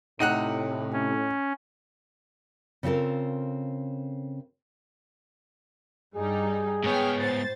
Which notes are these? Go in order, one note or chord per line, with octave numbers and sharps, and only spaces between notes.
A2 C3 D#4 F#5 F#6
C#4
C#3 C4 F4 A4 A#4
G2 G3 D#4 G#4
G#2 B3 C#5 G5 F6
A2 C5 A6